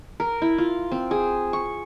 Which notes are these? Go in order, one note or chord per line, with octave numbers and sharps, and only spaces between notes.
A#4
E4
F4
C4
G#4
C#6